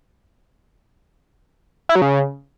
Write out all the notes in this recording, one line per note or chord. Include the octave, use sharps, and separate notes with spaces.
E4
F#3
C#3